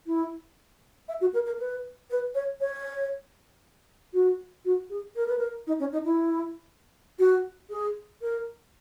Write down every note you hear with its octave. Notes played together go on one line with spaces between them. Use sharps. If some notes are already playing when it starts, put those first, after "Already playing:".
E4
E5
F#4
A#4
A#4
B4
B4
C#5
C#5
F#4
F#4
G#4
A#4
B4
A#4
D#4
C#4
D#4
E4
F#4
G#4
A#4